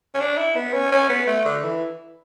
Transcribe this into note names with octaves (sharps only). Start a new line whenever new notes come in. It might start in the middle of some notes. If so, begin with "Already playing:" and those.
C#4
D4
E4
B3
C#4
C#4
B3
A3
D3
E3